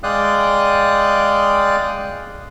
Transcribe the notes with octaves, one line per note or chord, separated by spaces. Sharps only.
G#3 D5 F5 G5 D#6 F#6